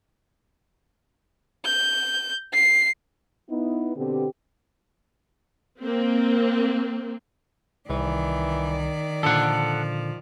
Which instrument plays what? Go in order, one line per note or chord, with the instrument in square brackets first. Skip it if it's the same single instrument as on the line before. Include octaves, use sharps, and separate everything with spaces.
[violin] G6
C7
[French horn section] B3 D#4 E4
B2 D3 B3 C4 G4
[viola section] A#3 C4
[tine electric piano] C2 [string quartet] D#3 D5 [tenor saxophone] E3
[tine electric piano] A#2 D3 [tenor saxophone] F3 [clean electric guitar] A4 F#5